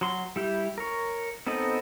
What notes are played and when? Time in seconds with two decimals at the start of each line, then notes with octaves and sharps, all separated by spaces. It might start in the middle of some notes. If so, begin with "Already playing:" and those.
0.01 F#3 C6
0.36 G3 E4 G4
0.78 A#4 C#5
1.47 B3 C4 D#4 A4 D#5